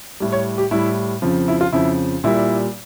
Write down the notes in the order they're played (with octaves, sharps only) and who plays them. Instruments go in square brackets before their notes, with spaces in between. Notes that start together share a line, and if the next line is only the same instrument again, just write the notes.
[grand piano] A2 G3
C#5
G4
A2 G3 E4
F2 C#3 F3
E4
F4
F2 C#3 F3 E4
A#2 G3 E4